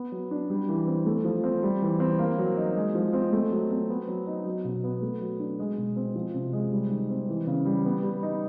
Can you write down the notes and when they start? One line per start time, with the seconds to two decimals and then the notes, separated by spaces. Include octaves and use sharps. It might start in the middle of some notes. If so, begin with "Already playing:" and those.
Already playing: B3
0.12 F#3
0.31 D4
0.50 G3
0.69 E3
0.87 C4
1.06 A3
1.25 F3
1.44 C4
1.63 G3
1.82 E3
2.00 C4
2.19 A#3
2.38 F#3
2.57 D#4
2.76 G#3
2.95 F3
3.13 C4
3.33 A3
3.51 F#3
3.71 C4
3.89 B3
4.08 F#3
4.27 D#4
4.45 F#3
4.64 B2
4.84 B3
5.02 A3
5.22 F#3
5.40 D4
5.59 G#3
5.78 B2
5.96 C4
6.15 F3
6.34 C3
6.53 G#3
6.72 G3
6.90 D#3
7.09 C4
7.28 E3
7.47 C#3
7.65 G3
7.85 B3
8.03 G3
8.23 D#4